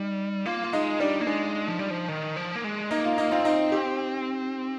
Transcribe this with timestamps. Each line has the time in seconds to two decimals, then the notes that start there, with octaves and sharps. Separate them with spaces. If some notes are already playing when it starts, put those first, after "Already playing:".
Already playing: G3 D#4
0.46 A#3 F4
0.63 F4
0.73 G#3 D#4
1.00 G3 D4
1.21 A#3
1.27 G#3 D4
1.68 F3
1.79 G3
1.90 F3
2.08 D#3
2.36 F3
2.56 A#3
2.64 G#3
2.90 A#3 D#4
3.04 F4
3.18 D#4
3.31 C4 F4
3.45 D#4
3.72 G4